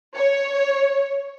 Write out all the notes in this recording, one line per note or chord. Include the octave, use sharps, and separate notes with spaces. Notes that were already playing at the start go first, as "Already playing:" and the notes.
C#5